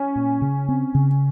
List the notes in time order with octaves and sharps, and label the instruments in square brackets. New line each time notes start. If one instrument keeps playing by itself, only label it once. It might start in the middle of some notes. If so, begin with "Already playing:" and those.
Already playing: [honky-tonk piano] C#4
[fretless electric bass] A#2
C#3
C4
C#3